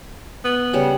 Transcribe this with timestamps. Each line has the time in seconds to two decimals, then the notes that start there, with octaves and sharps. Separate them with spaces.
0.44 B3
0.73 C#3 G3 F#5